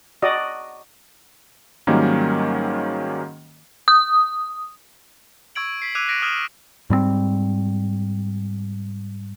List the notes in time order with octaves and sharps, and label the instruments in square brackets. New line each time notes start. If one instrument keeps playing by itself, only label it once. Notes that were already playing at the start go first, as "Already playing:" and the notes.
[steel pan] F#4 D5 D#5
[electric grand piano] G#2 D#3 F#3 G3 A#3 C#4
[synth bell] D#6
[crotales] C#6 E6 G#6 D7 F#7
B6 C7
D6 E6 F#6 G#6 D#7 F7
F#6 A#6 B6 D7
D#6 F6 G#6 E7 F#7
[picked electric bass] G#2 G3 G#3 C4